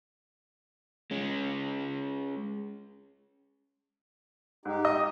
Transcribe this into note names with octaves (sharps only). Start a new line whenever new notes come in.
G#3 C#4
G#2 D#4 G4
D#5 D#6